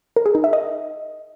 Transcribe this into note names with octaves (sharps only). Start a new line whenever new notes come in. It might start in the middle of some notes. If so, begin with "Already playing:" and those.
A#4
G#4
D#4
E5
D#5